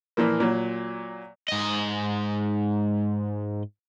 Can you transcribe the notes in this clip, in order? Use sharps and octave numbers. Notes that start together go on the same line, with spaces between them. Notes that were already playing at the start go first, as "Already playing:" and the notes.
A#2 E3 F3 A#3
A#2 F#3
G#2 D#5